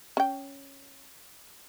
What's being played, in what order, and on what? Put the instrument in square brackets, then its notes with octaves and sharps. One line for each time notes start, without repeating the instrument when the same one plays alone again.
[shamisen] C#4 G5